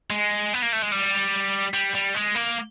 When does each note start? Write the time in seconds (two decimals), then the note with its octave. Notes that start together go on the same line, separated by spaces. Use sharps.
0.10 G#3
0.54 B3
0.63 A#3
0.73 A3
0.82 G#3
0.92 G3
1.74 G3
1.94 G3
2.14 G#3
2.35 A#3